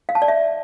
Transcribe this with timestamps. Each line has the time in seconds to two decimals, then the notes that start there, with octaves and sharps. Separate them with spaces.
0.09 F5
0.15 A5
0.22 D5
0.28 E5